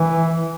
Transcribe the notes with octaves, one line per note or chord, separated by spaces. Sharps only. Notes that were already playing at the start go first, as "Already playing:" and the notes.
Already playing: E3